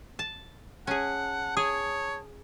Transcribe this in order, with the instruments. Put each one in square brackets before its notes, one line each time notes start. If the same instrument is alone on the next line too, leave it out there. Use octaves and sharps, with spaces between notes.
[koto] A5
[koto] C#4 G#4 [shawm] F#5 [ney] A5
[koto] G#4 [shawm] C#5 [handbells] D#6